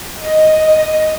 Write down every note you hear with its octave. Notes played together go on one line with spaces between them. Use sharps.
D#5